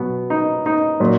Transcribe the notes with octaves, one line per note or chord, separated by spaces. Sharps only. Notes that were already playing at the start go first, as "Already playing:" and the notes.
Already playing: B2 F#3 B3
D#4
D#4
A#2 F#3